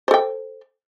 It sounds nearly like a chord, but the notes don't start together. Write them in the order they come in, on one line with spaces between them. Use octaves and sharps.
C5 A4 G5